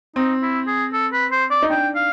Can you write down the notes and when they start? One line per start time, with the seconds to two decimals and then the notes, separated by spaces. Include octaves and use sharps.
0.16 C4 D#4
0.42 E4
0.67 G#4
0.93 A4
1.13 B4
1.32 C5
1.51 D5
1.62 D#4
1.70 D4 G5
1.96 F5